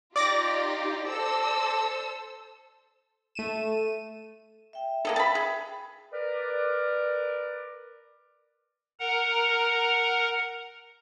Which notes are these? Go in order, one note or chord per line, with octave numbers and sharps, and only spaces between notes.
D#4 F4 G4 D5 D6 A#6
A4 C5 E6
A3 D#7 E7
E5 G5
A#3 G#4 A4
A5 B5
G#4
A#4 B4 D5
A#4 F#5 A#5